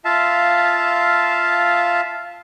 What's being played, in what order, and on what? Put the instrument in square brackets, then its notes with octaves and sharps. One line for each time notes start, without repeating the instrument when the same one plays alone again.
[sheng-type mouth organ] F4 E5 F5 A5